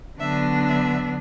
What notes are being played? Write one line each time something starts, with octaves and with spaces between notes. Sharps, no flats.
D3 F#3 B3 D4 E5
E5